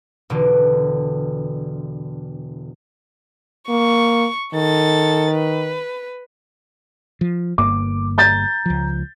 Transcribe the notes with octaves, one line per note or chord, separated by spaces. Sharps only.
E1 B2 D3 G4
A#3 C#6
D#3 A4 A6
B4
F3
G1 G2 A#3 D6
A#5 G6 A6
C#2 F3